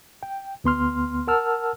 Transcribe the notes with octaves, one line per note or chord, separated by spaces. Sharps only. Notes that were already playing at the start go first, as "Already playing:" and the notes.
G5
D2 B3 C6 F6
A#4 F#5 A5 E6 F6